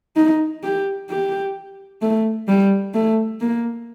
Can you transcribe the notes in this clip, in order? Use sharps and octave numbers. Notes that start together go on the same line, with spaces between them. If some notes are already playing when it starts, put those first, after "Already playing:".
D#4
G4
G4
A3
G3
A3
A#3